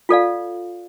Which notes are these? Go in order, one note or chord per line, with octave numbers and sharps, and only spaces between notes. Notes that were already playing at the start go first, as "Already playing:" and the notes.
F4 A4 D5 F5